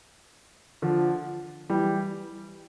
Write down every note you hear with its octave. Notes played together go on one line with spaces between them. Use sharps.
D3 F3
E3 G3